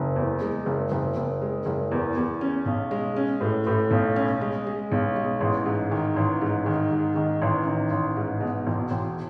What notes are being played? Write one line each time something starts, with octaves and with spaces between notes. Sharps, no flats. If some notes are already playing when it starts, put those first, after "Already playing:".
Already playing: F#1
E2
G#3
F#1
F#1
F#1
G#3
F#1
E2
E2
C#4
B1
G#3
C#4
A2
A2
B1
C#4
G#3
G#3
B1
G#3
A1
G#2
D#3
A1
G#2
D#3
G#2
D#3
A1
D#3
A1
G#2
B2
E1
E1